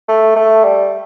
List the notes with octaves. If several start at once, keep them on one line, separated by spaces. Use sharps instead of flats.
A3
A3
G3